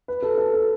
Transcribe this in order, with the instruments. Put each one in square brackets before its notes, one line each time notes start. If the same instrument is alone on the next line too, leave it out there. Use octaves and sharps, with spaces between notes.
[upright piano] B4
A4
A4
A4